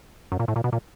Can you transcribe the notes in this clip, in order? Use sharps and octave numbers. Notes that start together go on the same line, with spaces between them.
F#2
A#2
A2
A#2
B2
A#2